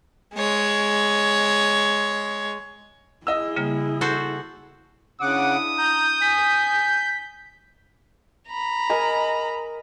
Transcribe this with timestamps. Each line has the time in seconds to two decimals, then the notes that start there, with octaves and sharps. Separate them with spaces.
0.34 G#3 C#5
3.27 E4 G#4 D#5 E6
3.56 C#3 G3 A#3
4.01 F#4 A4 C5
5.21 C#3 D4 E4 F#5 D6 D#6
5.78 A#5 G6
6.22 G#5 B6
8.49 A#5 B5
8.90 A#4 D#5 G#5